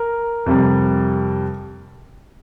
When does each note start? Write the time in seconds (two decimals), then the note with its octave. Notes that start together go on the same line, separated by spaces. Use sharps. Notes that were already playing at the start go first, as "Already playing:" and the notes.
Already playing: A#4
0.46 F2 C3 G3